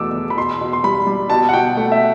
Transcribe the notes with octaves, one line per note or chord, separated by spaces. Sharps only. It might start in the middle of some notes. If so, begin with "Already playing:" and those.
Already playing: E2 B2 A3 D6 E6
E2
B5
B2 C6
B2
C6
G3 B5
G3
B2 A5
F#5
B2 G5
A3 F#5
E5